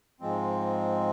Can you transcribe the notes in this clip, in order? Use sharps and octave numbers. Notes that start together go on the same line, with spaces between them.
G#2 F3 G#3 C4